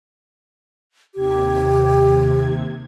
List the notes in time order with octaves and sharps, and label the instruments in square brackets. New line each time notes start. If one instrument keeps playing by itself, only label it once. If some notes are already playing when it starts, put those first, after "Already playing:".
[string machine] D#2 C3 G#6 [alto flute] G4